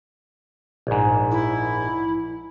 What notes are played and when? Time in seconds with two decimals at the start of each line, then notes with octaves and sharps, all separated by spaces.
0.87 A#1 G#2
1.31 E4